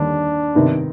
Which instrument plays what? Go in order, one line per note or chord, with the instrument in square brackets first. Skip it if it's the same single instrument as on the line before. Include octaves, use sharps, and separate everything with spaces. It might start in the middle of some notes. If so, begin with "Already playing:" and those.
Already playing: [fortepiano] D#2 D3 G3 [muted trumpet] D4
[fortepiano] C3 D#3 B3